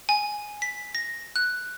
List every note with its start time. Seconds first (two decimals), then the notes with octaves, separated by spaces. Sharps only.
0.09 G#5
0.62 B6
0.95 A#6
1.36 F#6